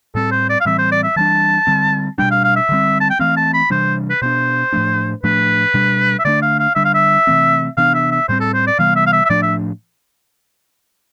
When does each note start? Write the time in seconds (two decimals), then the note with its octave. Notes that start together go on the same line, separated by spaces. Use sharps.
0.15 A2 G3 C4 A4
0.32 C5
0.49 D5
0.61 F5
0.65 A2 E3 G3 C4 E5
0.79 C5
0.92 D5
1.03 E5
1.16 E3 G3 D4 A5
1.67 D3 G3 C4
2.18 B2 G3 D4 G5
2.31 F5
2.44 F5
2.56 E5
2.69 D3 G3 C4
3.00 A5
3.10 G5
3.19 E3 A3 C4 F5
3.37 A5
3.54 B5
3.70 C3 E3 G3 D4 C5
4.10 B4
4.22 B2 B3 D4 C5
4.73 A2 F3 A3 D4
5.23 A2 F3 A3 D4 B4
5.74 B2 G3 D4
6.19 E5
6.25 D3 A3 D4 D5
6.42 F5
6.60 F5
6.75 D3 G3 D4 E5
6.85 F5
6.95 E5
7.27 C3 E3 A3 C4
7.77 C3 E3 B3 D4 F5
7.94 E5
8.11 E5
8.29 A2 G3 C4 C5
8.41 A4
8.54 C5
8.67 D5
8.79 C3 E3 G3 B3 F5
8.96 E5
9.07 F5
9.13 E5
9.25 E5
9.30 A2 F3 A3 D4 D5
9.43 E5